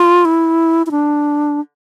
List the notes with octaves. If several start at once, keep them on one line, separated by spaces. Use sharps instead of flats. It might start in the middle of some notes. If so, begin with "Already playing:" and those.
Already playing: F4
E4
E4
D4